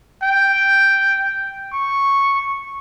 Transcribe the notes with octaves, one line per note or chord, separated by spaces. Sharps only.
G5
C#6